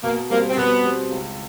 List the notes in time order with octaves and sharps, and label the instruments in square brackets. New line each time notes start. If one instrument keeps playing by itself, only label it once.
[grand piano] B2 [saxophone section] A#3
[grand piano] G3 C4 [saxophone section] A#3
[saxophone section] C4
[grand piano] B2 [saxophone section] B3
[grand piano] G3 C4
C#2